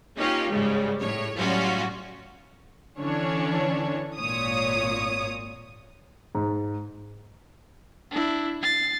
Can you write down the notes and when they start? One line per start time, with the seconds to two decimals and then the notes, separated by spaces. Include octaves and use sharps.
0.16 A#3 C#4 D#4 F4 G4 C#5
0.49 G#2 C#3 G3 G#3
0.99 A2 C#5
1.36 A2 F#3 G3 C#4 F4 F#4
2.99 D3 E3 C#4 D4 C#5
4.20 G#1 A#2 C#5 D#6
6.35 G#2
8.11 D4 E4
8.62 A6 C7